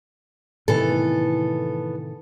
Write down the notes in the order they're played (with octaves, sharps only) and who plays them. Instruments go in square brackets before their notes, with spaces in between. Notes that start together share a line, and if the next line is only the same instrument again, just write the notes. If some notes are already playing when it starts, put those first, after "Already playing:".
[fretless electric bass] A2 C3 D#3 [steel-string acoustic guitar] E3 B3 A4